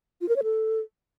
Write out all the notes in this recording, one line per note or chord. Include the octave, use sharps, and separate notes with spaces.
F4
A#4
C#5
A4